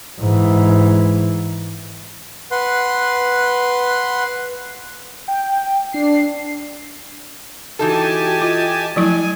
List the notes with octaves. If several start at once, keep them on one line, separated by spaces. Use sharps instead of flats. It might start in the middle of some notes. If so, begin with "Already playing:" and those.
G#2 E3
B4 F#5 C6
G5
D4 C7
E3 D#4 F#4 G4 A4 G#5 A5
F4 D#5
F3 F#3 A3 E4 G#5